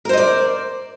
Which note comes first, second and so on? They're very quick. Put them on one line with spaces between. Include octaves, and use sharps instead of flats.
A#4 C5 D#5 D5